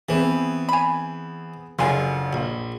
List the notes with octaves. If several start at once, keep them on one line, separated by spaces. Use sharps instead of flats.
E3 B3 C4 G#4
G#5 B5
F#1 D3 F3 G#5 C6
A#1